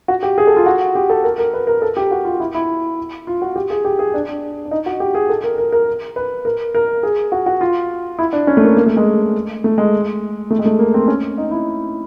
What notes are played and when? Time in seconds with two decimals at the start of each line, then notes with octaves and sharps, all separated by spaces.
0.08 F#4
0.23 G4
0.38 G#4
0.47 A4
0.56 F4
0.66 F#4
0.95 G4
1.10 A4
1.24 A#4
1.38 A#4
1.54 B4
1.67 A#4
1.82 A4
1.97 G4
2.11 F#4
2.25 F4
2.40 E4
2.54 E4
3.27 F4
3.42 F#4
3.56 G4
3.70 G#4
3.85 G4
3.99 G#4
4.14 D4
4.29 D4
4.65 D4
4.71 D#4
4.86 F#4
5.00 G4
5.15 G#4
5.29 A4
5.44 A#4
5.58 A#4
5.72 A#4
6.16 B4
6.45 A#4
6.75 A#4
7.03 G#4
7.32 F#4
7.46 F#4
7.61 F4
8.19 E4
8.33 D4
8.47 C#4
8.57 A3
8.63 A#3
8.77 A#3
8.86 A3
8.97 G#3
9.64 A3
9.78 G#3
10.50 A3
10.59 G#3
10.65 A3
10.79 A#3
10.94 C4
11.08 C#4
11.38 D#4
11.51 E4